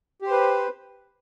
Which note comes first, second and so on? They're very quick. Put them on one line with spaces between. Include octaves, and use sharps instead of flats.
G4 C5 B4